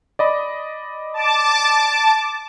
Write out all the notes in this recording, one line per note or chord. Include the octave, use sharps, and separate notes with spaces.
D5 D#5 B5
A5 D6